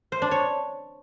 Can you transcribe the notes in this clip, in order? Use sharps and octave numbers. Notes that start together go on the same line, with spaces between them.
C5
D4
C#5